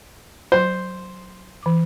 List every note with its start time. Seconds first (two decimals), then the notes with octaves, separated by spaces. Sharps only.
0.52 F#3 C5 C6
1.63 E3 D6